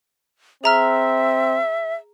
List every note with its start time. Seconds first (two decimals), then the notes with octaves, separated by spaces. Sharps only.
0.64 C4 G#4 E5 A#5 F6